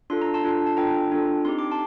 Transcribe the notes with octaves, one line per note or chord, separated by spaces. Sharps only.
D4 F4 A4 C6
A#5
A5 C6
D4 F4 A4
A5
D4 F4 A4 G5 A#5
D4 F4 A4
C4 D#4 G4 C6
D6
A5 C6